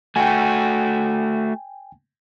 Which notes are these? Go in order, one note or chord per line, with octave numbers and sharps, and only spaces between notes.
A3 F#4 G5 G#5